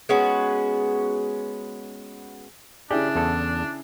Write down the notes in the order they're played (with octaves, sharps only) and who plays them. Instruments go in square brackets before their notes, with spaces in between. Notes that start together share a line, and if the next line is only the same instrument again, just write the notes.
[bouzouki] G#3 B3 C#4 F#4
[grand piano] C#3 E4 G#4 [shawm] D4 [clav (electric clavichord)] G4 D5 G5
[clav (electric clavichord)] E2 A4